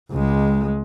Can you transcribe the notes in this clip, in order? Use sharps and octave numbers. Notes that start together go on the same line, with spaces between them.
C#2 G#3